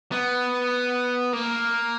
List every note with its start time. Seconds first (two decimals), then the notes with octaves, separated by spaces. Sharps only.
0.12 B3
1.33 A#3